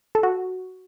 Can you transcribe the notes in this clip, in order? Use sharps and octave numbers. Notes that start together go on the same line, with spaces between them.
A4
F#4